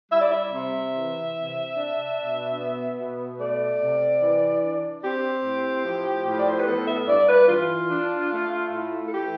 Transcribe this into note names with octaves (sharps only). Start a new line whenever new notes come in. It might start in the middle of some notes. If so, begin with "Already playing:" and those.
G3 E5
D5
E5
C3
E3
C3
D4
B2
B3
B2
A3 D5
C3
E3
D4
C4 G4
A2
F3
A2
D5
C5
B4
B3 A4
E5
G2 D5
B4
E3 F4
D4
A3
A2
A4
E3 G4